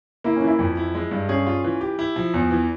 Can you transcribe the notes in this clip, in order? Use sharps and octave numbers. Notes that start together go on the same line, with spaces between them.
A#3 E4
C#4
E3
E4
F2
E4
G#3
G2
C#4 G#4
F4
E3
G4
E4
F3
E2
E3